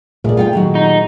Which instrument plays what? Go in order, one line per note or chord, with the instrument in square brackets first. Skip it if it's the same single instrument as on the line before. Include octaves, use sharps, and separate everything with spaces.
[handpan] A#2 A3 G#4 [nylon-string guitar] A#4 D5
[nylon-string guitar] F4 F#5 G5
D#3 F#3 F#4
[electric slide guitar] D#4